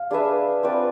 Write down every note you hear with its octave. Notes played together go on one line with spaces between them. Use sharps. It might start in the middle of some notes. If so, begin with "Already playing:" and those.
Already playing: F5
D4 G#4 B4 E5
C4 F4 B4 D5